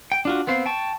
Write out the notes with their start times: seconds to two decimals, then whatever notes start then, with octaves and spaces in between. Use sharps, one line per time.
0.12 G5
0.25 D4 F4 F#4
0.47 B3 C4 C5 F5
0.66 G5 A5 C#6